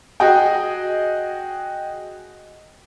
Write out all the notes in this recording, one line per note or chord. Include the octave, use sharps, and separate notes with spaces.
F#4 G#4 D#5 G5